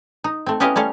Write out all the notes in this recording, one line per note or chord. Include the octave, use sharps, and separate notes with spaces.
D#4
A3 C4
B3 C#4 E4 G4 D#5 F5
G3 A3 C#4 F5